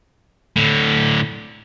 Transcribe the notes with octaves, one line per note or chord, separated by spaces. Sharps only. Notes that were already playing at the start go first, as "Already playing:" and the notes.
A2 D3